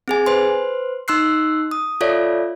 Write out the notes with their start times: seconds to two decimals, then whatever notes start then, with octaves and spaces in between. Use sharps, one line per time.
0.08 C4 G#4 G#5
0.26 B4 C5 C6
1.08 D#4 C6 E6 F#6 C7
1.71 D#6
2.01 F4 A4 C#5 D5 E5